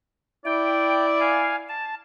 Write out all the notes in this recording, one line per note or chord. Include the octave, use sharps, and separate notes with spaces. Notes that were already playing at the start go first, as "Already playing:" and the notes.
E4 D5 G5
F5 G#5
A5